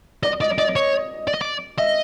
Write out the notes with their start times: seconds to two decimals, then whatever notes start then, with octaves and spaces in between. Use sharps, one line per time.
0.23 D5 D#5
0.41 D5 D#5
0.58 D5 D#5
0.76 C#5
1.27 D5
1.34 D#5
1.41 D5
1.78 D#5 E5